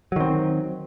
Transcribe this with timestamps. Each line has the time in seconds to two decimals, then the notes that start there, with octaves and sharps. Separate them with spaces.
0.12 F#3
0.16 D#3
0.20 C4